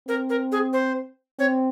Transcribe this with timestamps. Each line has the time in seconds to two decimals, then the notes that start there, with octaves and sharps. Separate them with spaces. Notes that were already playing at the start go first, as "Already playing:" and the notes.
0.08 C4 A#4
0.30 A#4
0.52 G#4
0.73 C5
1.39 C4 C#5